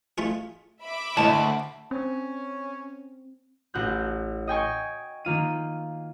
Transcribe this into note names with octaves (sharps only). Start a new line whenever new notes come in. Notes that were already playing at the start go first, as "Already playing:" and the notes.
A3 F4 G#4
E5 B5 D6
D2 A2 G#3 A#3 A5
C4 C#4
A1 F#4 F#6 G6
D#5 G5 G#5 C#6
D#3 A#3 F4 D#7